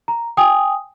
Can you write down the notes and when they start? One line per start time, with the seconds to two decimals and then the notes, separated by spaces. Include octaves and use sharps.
0.08 A#5
0.37 G5 G#5 D#6